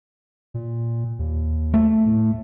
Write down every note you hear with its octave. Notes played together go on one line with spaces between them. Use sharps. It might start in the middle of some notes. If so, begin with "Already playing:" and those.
A#2
D#2
A3
A2